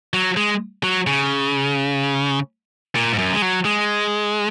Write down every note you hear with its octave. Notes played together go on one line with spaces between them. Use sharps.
F#3
G#3
F#3
C#3
A#2
G#2
F#2
G#3
F#3
G#3